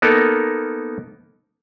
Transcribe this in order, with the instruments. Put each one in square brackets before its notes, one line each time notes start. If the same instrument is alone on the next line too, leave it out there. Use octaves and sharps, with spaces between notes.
[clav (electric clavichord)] A#3 B3 D#4 A4 A#4